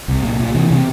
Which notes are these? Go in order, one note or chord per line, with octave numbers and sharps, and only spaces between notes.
C2
A#2
A#2
C3 E3
C3